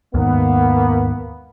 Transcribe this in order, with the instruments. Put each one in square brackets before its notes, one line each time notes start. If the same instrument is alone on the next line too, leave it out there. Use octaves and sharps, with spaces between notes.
[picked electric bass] D#2 G#2 D#3 [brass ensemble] A#3 B3